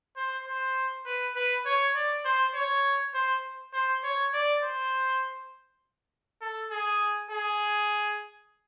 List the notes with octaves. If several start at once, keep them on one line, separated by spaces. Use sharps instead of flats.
C5
C5
B4
B4
C#5
D5
C5
C#5
C5
C5
C#5
D5
C5
A4
G#4
G#4